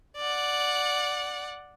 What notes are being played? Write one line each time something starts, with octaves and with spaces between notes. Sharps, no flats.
D5 F#5